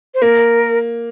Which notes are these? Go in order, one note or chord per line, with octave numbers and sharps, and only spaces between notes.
C5
A#3 A#4